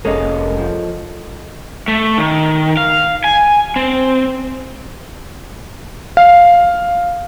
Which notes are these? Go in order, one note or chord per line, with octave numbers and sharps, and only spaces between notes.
F1 G#3 A#3 C#4 A4 D#5
F3
A3
D#3
F5
G#5
C4
F5